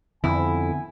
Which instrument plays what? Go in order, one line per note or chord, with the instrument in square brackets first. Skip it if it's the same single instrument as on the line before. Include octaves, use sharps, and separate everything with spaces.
[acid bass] F2 [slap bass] D3 B3 C4 [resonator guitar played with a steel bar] E4 [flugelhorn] G#5